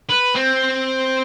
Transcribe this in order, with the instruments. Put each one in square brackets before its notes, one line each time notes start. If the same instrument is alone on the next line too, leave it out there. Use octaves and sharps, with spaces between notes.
[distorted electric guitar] B4
C4